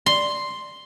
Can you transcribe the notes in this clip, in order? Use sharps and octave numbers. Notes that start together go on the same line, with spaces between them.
C6